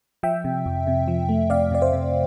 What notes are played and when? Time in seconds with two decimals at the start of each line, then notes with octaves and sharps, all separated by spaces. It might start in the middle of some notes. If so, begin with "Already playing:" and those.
0.23 F3 E5 G5
0.44 C3
0.66 F2
0.87 C3
1.08 F3
1.29 A3
1.50 C3 D5 F5
1.71 C3 D5
1.82 C5 E5
1.93 C3